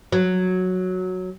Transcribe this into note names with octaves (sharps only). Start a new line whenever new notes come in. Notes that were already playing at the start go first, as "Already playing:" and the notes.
F#3